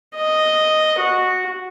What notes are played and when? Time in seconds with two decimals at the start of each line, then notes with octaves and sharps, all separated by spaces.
0.15 D#5
0.99 F#4